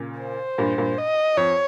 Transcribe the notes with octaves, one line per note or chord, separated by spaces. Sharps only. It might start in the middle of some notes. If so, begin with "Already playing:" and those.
Already playing: A#2 C#3
C5
G2 A#2
G2 A#2
D#5
F2 C#5